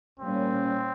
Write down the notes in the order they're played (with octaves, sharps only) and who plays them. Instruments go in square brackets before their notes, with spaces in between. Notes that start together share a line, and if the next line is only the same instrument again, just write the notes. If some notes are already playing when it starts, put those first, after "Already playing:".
[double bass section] A#2 G3 A#3 C#4 [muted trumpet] C4